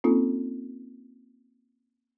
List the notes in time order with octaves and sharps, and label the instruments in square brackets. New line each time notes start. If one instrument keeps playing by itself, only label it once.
[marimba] A#3 C4 C#4 D#4 F4 A4